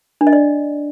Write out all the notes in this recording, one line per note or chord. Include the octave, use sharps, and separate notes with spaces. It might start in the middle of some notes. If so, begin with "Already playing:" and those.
D4
D#5
D5